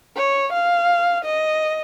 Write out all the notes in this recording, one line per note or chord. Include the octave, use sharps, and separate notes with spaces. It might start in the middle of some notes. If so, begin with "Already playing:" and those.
C#5
F5
D#5